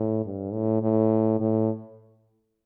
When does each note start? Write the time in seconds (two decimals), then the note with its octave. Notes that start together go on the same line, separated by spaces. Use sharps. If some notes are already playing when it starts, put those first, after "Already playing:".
Already playing: A2
0.25 G2
0.53 A2
0.82 A2
1.40 A2